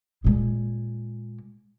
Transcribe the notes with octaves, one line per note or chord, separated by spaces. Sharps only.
A#2 G#3